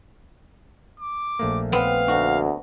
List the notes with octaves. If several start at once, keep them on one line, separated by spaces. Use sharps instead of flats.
D6
A#1 A3 A#3
B3 C4 F5
D2 F#4